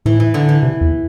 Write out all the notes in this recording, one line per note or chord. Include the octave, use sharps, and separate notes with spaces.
A2 E3
E3
D3
E3
C3
E2